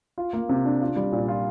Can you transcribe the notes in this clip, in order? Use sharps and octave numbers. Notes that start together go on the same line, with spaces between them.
F4
A#3
C3
D4
F4
G3
A#2
F4